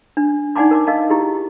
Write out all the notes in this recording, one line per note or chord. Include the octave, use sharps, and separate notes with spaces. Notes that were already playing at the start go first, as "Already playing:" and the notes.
D4
D#4 D5 F#5 G#5 A5 D6
A#4 A5 D6
A#4 D#5 F5 A5
E4 G4 G#4